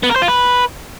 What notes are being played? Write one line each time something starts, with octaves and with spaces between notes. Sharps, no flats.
B3
A#4
C5
F4
B4